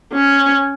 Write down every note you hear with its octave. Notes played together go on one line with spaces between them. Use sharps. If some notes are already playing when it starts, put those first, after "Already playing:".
C#4